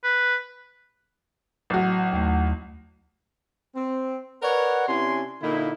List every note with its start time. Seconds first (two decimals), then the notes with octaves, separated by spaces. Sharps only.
0.04 B4
1.70 A1 F#3 F#4
2.13 D#2 A3
3.75 C4
4.43 A#4 B4 C#5 D5 F#5
4.88 C3 C#4 D4 E4 G#5 C6
5.42 A#2 D3 A#3 D#4 E4